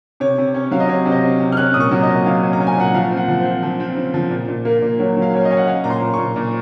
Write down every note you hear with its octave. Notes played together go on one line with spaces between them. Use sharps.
C3 C#5
C3
C#4
F#3 F5
D#5
C3 C#5
C3
D#5
C#4
C3
F6
C#4 F#6
A#2 D#6
C#6
F#3
D#5
A#2
F#3 F5
C#4
A#5
C#4
G#5
A#2 F#5
F3 F5
C4
F#5
F3
C5
C4
F3
C4
C#3
F3
A#2
A#2
A#3
A#2
F#3 C#5
F#3
F5
C#4 C#5
D#5
C#4
F#5
C#4 F5
A#2 A#5
C6
A#2
A#2 C#6
A#2